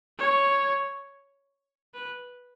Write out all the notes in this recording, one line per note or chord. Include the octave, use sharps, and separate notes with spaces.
C#5
B4